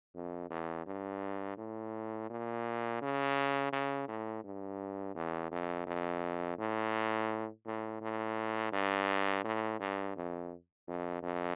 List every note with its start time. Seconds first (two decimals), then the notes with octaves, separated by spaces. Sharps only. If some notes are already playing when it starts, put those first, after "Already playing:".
0.15 F2
0.50 E2
0.86 G2
1.58 A2
2.30 A#2
3.01 C#3
3.72 C#3
4.08 A2
4.44 G2
5.15 E2
5.51 F2
5.87 F2
6.58 A2
7.66 A2
8.01 A2
8.73 G2
9.44 A2
9.80 G2
10.16 F2
10.88 F2
11.23 F2